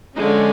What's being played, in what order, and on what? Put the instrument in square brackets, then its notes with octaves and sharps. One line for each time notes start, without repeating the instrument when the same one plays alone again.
[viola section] D3 F3 G#3 C#4 D#4